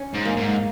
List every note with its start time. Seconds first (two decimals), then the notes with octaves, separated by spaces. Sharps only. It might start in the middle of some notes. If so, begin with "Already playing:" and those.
Already playing: C#4
0.14 G#2
0.25 A#3
0.37 G#2